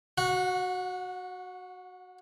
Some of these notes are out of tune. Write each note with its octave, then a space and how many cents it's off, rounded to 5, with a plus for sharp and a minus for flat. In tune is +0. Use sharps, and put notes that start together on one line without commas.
F#4 +0 F#5 -30